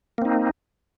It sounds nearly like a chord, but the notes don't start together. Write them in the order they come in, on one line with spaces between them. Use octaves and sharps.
A#3 C4 D#4